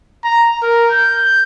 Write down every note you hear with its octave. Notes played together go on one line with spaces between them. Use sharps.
A#5
A#4
G6